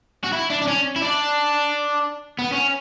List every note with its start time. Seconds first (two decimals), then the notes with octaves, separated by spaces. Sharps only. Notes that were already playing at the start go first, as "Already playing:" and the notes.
0.24 F#4
0.33 E4
0.50 D4
0.62 D4
0.67 C#4
0.96 E4
1.02 D4
2.39 B3
2.52 C#4